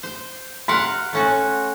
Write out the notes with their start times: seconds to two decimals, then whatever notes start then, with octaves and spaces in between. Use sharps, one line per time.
0.03 C5
0.68 A#4 F5 F#5 C6 B6
1.13 A3 C#4 F#4